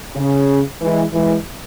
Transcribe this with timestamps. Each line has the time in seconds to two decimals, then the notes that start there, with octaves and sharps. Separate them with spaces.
0.16 C#3
0.81 E3 G#3
1.13 E3 G#3